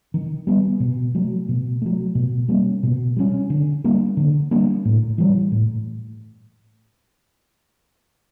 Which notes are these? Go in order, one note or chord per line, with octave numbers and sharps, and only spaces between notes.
D#3
G3 B3
B2
F#3 A3
B2
F#3 A3
B2
G3 A#3 C#4
B2
G3 A#3 C#4
D3
G3 A#3 D4
D3
G3 A#3 D4
A2
E3 G3
A2